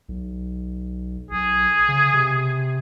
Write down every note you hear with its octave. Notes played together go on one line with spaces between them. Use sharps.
B1
B1 G#4
C#3
C3